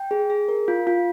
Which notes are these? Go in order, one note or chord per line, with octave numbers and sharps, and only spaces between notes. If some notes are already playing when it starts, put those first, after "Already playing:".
Already playing: G5
G#4
G#4
A#4
F4
F4